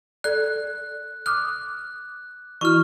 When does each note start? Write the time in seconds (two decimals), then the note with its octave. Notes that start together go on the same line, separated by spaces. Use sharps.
0.24 A4 D5 F#6
1.26 D6 D#6 F6 F#6
2.61 E3 E4 F#4 C#6 F6